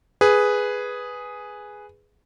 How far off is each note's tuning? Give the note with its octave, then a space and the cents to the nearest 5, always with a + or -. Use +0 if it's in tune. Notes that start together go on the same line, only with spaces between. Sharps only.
G#4 +0 B4 +0